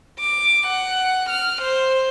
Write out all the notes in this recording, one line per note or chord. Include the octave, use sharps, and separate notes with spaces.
D6
F#5
F6
C5